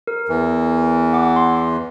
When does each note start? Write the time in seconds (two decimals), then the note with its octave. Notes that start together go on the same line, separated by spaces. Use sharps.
0.07 A#4
0.29 E2 E3
1.13 F#5 D6
1.36 C6